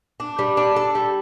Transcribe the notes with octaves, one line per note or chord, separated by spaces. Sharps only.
D4
G3
D4
A4
G3